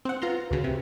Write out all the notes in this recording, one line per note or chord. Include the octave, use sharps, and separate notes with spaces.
C4 F#5
F4 B4 A#5 C6
D2 C#3 F#4
C3 G4